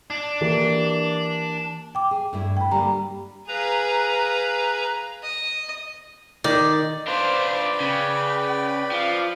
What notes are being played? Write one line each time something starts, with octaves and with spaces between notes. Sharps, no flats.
D4
E3 A#3 G4
G5 D6
G#4
G2 A3 E4
G5 B5
D3 G3 A#3 A#5
G#4 B4 F5 A#5
D#5
D#3 D5
D4 F4 B4 C5 D5 B5
C#3 G5
F3 F5